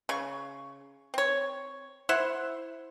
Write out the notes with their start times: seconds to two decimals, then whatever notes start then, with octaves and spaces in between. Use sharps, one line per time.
0.09 C#3 C#6
1.14 C4 C#5
2.09 E4 C5 E5 F#5